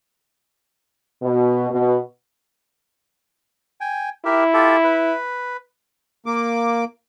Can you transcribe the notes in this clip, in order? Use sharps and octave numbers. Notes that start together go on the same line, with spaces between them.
B2
B2
G5 G#5
E4 G4 A#4 E5
F4 G4 A4
B4
A#3 D6